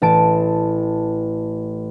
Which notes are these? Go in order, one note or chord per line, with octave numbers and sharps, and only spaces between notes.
A1 A5 D7